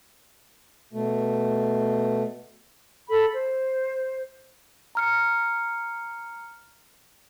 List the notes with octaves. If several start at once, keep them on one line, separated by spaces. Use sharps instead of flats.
B2 A3
A4 B5
C5
A#5 F6 C#7